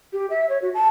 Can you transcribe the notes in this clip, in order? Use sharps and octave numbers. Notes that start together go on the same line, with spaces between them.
G4
E5
C#5
F#4
A5